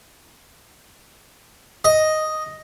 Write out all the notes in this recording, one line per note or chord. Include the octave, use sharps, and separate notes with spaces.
D#5